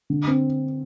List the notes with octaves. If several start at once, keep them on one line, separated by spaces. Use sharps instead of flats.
D3
C4